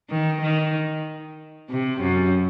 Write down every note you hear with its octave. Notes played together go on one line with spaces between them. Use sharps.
D#3
D#3
C3
F#2